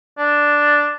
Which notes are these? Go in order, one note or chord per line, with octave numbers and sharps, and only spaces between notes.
D4